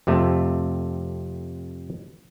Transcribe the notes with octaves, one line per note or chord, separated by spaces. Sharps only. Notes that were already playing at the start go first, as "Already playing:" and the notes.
F2 C3 A3